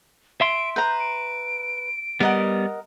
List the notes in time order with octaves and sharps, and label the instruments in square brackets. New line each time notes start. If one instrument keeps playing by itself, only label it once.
[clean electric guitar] E5 C6 [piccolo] D7
[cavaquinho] B4 A#5 [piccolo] G6
[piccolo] D7
[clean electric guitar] G3 B3 [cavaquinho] A#4 D#5 F#5